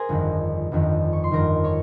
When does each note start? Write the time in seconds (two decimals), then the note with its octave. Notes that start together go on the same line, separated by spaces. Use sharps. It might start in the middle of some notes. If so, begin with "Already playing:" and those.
Already playing: G#4 A#4 C5 G#5 A#5 C6
0.09 G1 F2 D#3
0.71 G1 F2 D#3
1.13 C#6
1.24 C6
1.31 G1 F2 D#3 A#4 A#5
1.64 C#5 C#6